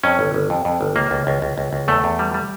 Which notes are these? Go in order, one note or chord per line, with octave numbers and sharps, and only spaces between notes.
F2 C#4
G1
G1
F2
F2
G1
C#2 A#3
C#2
C#2
C#2
C#2
C#2
E2 A3
E2
G3
G3